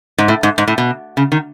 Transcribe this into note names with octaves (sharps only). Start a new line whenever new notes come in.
G#2
A2
G#2
G#2
A2
B2
C#3
D#3